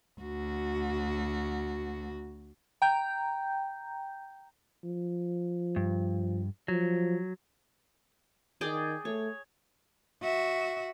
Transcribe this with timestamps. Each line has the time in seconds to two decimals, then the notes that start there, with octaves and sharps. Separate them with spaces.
0.20 D2 F#4
2.82 G5 A#5 G6
4.84 F3
5.76 G2
6.68 F3 F#3
8.61 D#3 G#4 D5 G5
9.05 A3 C#5
10.22 F#4 E5